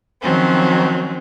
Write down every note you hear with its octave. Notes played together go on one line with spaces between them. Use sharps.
D#3 F3 F#3 C4 C#4